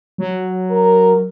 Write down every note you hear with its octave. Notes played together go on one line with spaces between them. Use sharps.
F#3
A#4